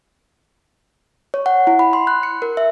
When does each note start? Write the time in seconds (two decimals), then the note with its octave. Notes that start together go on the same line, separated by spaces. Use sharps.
1.34 C#5
1.46 F#5
1.67 E4
1.79 B5
1.93 C6
2.07 F#6
2.23 C#7
2.42 A#4
2.57 E5